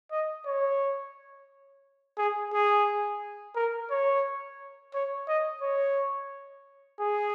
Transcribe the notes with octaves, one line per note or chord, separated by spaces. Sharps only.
D#5
C#5
G#4
G#4
A#4
C#5
C#5
D#5
C#5
G#4